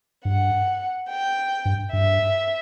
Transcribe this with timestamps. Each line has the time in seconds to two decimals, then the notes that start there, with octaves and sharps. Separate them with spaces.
0.25 G2 F#5
1.09 G5
1.65 G2
1.93 G2 E5